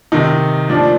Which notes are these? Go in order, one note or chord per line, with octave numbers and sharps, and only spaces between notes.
C3 D#3 D#4
A#2 F3 D4